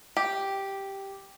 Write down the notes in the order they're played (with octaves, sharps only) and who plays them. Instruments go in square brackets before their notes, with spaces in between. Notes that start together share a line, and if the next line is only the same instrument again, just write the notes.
[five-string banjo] G4